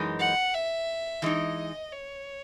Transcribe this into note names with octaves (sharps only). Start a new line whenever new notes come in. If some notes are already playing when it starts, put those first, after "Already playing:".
Already playing: F#2 E3 G#3 D#4
F#5
E5
E3 G#3 D#4 D#5
C#5